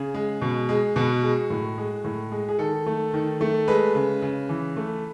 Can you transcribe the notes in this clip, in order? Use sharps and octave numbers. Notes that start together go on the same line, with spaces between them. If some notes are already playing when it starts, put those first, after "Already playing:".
Already playing: C#3 G#4
G#3
B2
G#3
B2 F#4
G#3
A2
G#3
A2
G#3
G#4
D#3 A4
A3
D#3
A3
G#3 B4
C#3
C#3
E3
A3